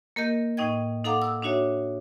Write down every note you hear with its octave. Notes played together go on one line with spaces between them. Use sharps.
A#3 A#4 D#5 G6
A2 D#4 D#5 G5 G#6
D#4 A4 F5 F#5 A#5 D6
E6
D4 D#4 F#4 C#5 E5